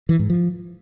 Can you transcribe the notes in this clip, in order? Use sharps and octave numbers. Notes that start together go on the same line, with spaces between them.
E3
G#2
F3